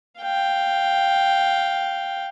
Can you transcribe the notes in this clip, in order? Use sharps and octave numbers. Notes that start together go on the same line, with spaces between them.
F5 G5